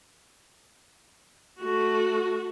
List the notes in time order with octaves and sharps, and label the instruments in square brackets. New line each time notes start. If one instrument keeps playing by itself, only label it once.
[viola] A3 F#4